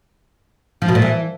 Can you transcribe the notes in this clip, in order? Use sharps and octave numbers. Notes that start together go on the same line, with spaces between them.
F3
B2
A#2
E3